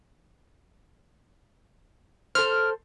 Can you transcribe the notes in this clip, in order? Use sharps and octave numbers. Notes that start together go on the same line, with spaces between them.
A4 C5 F6